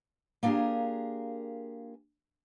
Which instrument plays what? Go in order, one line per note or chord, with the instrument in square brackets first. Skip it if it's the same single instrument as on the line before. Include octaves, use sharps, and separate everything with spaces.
[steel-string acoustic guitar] A#3 D4 F4 G4 G#4 A#4